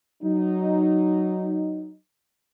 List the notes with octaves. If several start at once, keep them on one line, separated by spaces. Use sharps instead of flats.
F#3 D#4